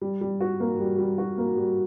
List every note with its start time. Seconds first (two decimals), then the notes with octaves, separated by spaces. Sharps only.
0.02 G3
0.21 G3
0.40 F#4
0.60 A#3
0.80 G3
0.98 G3
1.18 F#4
1.38 A#3
1.57 G3